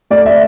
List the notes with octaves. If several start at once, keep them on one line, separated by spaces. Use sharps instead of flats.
A3 D5
E5